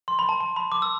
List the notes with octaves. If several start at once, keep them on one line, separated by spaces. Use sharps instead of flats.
C6
B5
A5
A5
B5
D6
E6